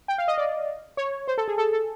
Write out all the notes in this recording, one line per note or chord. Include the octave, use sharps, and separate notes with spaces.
G5
F5
D#5
D5
C#5
C5
A4
G#4
A4
A4